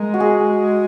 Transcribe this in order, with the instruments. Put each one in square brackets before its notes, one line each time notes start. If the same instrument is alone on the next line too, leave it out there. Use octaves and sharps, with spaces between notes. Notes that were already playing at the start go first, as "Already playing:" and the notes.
Already playing: [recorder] G#3 [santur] A#4
[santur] F#4
G#4